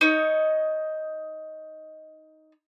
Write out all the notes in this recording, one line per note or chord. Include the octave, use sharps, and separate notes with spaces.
D#4 C#5 D#5